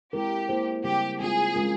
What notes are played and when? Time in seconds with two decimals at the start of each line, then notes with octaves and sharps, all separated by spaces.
0.13 G#3 C4 E4 G4 A#4
0.49 A#3 E4 G#4 C5
0.84 C#3 G3 C4 G4
1.20 G#3 C4 F4 G#4
1.55 G#3 C#4 F4 A#4